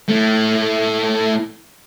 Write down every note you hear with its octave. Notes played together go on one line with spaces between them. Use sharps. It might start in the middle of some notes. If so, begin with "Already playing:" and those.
A3 E4